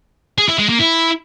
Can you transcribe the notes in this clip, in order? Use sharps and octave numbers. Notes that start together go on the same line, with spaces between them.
G#4
E4
G#3
A#3
E4